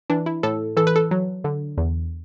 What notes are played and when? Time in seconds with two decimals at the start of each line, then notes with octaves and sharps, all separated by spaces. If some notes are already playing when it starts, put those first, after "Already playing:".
0.10 E3 D4
0.26 E4
0.43 A2 A4
0.77 E3 A4
0.87 B4
0.96 A4
1.11 F#3
1.44 D3
1.78 E2